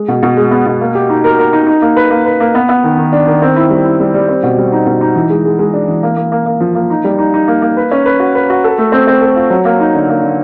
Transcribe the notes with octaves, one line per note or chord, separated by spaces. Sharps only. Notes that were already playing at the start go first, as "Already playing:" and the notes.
Already playing: G#3
B2
B2
G#3
B3
B2
A#3
G4
D#4
A#4
A#4
D#4
D#4
A#3
B4
A#3
B4
A#3
B3
B3
D#3
D#3
D4
D#3
C4
E4
G3
E4
G3
G3
C4
B2
G3
D#4
B2
D#4
E3
G#3
G#3
G#3
D4
E3
A#3
A#3
A#3
A#3
F3
A#3
D#4
G3
D#4
D#4
A#3
A#3
B4
C#4
B4
F#4
B4
F#4
A4
A3
C4
C4
A4
F4
F#3
A#3
D#4
D3
A#3
D3